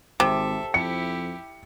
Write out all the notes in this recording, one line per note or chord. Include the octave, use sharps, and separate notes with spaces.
G#1 C3 A4 E5 D6
F2 E4 G4 C#7